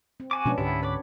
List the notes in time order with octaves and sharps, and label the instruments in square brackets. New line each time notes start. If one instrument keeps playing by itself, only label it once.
[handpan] C4
[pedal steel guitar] F#4 G#5 D6
[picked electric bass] B2 F3 G#3 [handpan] B3 C#4 D4
[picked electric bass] C#2 G#2 D3 [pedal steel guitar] B3 E4 [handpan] G4
[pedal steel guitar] B4 B5 D6 [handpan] C#5